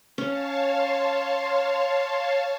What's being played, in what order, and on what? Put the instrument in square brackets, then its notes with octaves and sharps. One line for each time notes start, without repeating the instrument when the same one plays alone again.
[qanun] C#4 [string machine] C#5 F5 A5
[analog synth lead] C6